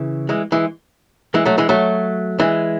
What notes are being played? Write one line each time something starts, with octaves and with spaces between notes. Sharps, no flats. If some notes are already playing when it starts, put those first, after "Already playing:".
Already playing: C#3 E3
E3 G#3
E3 G#3
E3 G#3
F#3 A3
E3 G#3
F#3 A3
E3 G#3